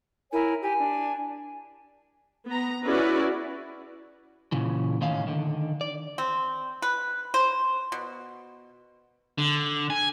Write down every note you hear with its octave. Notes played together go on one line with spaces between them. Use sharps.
E4 A#4 C#5 G#5
G4 G#5
D4
B3 A#5
C#4 E4 F#4 G#4 B4 D5
A#2 C#3 E3
A2 D#3 C#4 F5
D3 D#3
D5
C4
B4
C5
B2
D3
G#5